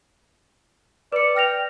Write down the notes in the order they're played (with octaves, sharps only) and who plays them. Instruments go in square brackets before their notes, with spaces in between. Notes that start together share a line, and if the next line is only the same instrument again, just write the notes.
[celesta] B4 C#7 [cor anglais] D5
[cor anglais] G5 [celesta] F6 A#6 F7